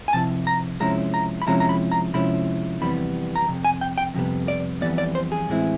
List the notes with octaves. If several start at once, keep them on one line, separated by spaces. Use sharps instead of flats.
G#5
C3 F3 E4 A5
A#5
C3 F3 G#3 C#4 E4 A#5
A#5
B5
C3 F3 G#3 C#4 E4 A#5
A#5
B5
A#5
C3 F3 G#3 C#4 E4 B5
F2 C3 E3 G3 B3 B5
A#5
F2 C3
G#5
G5
G5
F2 C3 G3 B3
D5
F2 C3 E3 G3 B3 D5
D5
C5
G#4
A2 E3 G#3 C4 E4